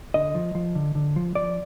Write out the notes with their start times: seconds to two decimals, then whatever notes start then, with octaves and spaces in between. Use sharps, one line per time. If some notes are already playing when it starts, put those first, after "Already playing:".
0.14 D3 D#5
0.35 F3
0.55 F3
0.75 D3
0.95 D3
1.16 F3
1.35 F3 D5